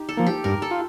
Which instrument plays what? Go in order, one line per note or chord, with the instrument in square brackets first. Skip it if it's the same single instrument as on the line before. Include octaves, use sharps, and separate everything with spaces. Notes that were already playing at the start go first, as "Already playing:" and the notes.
Already playing: [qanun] D#4 G4
A4
[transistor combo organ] F3 A#3
[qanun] G4
[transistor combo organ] G2 [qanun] A#4
[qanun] A4
[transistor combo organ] F4